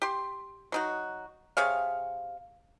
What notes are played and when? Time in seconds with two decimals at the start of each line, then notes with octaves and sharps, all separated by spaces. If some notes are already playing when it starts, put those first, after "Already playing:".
0.02 G4 C6
0.72 F#3 D#4 F#4
1.57 C3 G#4 C#5 F5